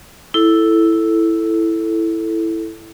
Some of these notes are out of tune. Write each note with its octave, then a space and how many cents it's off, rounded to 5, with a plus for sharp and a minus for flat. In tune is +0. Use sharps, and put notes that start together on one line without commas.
E4 +0 A4 +0